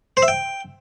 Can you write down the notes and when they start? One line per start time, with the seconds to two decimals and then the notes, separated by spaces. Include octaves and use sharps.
0.17 C5
0.22 E5
0.28 G5